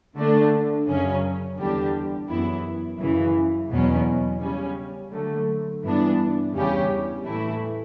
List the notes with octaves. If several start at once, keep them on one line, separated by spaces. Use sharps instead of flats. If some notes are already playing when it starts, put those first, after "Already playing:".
D3 A3 D4
F#2 C#3 F#3 C#4
E2 D3 G3 D4 G4
F#2 E3 B3 E4
F#2 C#3 E3
E2 B2 F#3 C#4
C#3 G3 C#4
D3 F#3 A3
G2 E3 B3 D4
E2 C#3 G3 C#4 G4
A2 E3 A3 E4